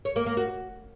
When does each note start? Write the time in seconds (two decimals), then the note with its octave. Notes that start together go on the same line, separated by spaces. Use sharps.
0.05 C#5
0.16 A#3
0.26 A#3
0.37 F#4